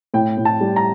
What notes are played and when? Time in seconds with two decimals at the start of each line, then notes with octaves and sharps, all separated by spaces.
0.14 A2 G5
0.37 A2
0.45 A5
0.61 G3
0.76 A#5